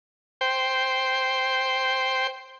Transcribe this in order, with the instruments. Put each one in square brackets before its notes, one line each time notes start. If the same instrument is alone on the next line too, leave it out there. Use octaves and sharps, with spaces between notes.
[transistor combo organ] C5 G5